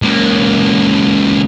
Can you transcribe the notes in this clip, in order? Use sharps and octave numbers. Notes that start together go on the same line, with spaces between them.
C#2 A#3